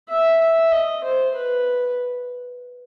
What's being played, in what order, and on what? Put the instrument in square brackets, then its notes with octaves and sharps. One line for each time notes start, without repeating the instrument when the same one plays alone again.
[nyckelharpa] E5
E5
D#5
C5
B4